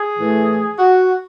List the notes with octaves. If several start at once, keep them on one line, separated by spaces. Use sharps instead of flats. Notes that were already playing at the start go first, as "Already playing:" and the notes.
Already playing: G#4
A2 E3 A3
F#4